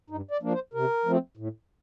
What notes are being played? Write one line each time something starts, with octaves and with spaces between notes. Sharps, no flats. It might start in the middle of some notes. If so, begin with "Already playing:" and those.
G2 D#4
D5
F3 A#3 D4
C5
C3 A#4
F3 A3 C4
A2